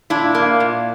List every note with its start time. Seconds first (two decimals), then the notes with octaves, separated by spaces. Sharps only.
0.10 A#2 D4 E4
0.35 A#3
0.60 A#2